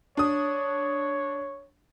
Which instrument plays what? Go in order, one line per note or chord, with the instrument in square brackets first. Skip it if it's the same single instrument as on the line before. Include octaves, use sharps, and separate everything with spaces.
[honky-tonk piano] D4 D#6 [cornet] C#5